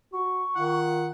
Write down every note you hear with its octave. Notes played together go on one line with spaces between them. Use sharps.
F#4 C#6
D#3 F4 F#5